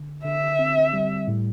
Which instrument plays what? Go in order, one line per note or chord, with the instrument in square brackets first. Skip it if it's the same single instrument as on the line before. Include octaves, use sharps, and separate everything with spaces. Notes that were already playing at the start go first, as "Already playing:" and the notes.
Already playing: [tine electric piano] D3
[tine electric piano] D3 [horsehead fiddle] E5
[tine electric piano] C4
G3
A2